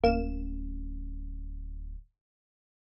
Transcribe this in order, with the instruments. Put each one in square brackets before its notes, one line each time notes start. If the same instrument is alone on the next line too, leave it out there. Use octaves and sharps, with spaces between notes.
[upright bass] D1 C#4 [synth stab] A#3 E7